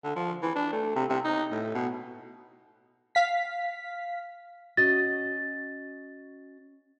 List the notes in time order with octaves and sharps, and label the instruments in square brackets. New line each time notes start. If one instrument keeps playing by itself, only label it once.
[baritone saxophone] D3
F3
E3
D4
A3
C3
C3
D#4
A2
B2
[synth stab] F5 B6
[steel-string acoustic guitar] C#4 F#4 D#5 [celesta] A6